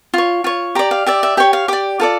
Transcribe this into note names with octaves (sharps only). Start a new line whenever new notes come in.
F4 C#5
F4 C#5
G4 D5 A#5
F5
G4 D5 E5
E5
G4 C#5 G5
F5
G4 D5 D6
F4 A4 D5